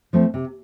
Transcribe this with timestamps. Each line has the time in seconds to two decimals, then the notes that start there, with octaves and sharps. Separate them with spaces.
0.13 F3 A3 C4
0.34 C3